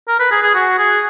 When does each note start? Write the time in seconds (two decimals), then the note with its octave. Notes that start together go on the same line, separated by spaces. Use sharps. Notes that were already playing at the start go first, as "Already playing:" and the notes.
0.08 A#4
0.20 B4
0.31 G#4
0.42 G#4
0.55 F#4
0.78 G#4